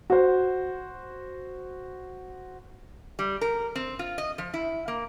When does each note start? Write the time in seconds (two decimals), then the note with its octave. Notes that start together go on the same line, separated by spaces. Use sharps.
0.10 F#4 C5
3.19 G3
3.41 A#4
3.76 C4
3.99 F4
4.18 D#5
4.38 F3
4.54 E4
4.88 A#3